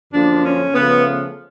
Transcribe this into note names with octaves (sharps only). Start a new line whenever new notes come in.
F#2 D3 F3 A#3 D4
C#4
C#3 F3 A3 B3